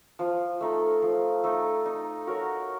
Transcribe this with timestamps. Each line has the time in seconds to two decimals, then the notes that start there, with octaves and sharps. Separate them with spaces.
0.19 F3
0.61 A3 D#4 A4
1.02 F3
1.44 A3 D#4 A4
1.86 D#4
2.27 F#4 A#4 C#5